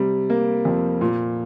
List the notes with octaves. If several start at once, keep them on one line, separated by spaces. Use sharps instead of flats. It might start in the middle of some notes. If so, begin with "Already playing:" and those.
Already playing: C3 G3
A#3
F2
A#2